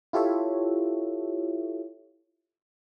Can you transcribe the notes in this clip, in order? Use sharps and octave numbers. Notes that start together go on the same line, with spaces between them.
E4 F4 G4 A4 C#5 E5